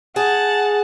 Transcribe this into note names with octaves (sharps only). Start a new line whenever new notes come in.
G#4 F#5 A5